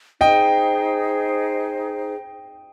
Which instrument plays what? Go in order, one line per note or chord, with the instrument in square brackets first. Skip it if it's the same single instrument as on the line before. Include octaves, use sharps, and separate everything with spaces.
[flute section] D#4 G#4 C5 [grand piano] D#5 G5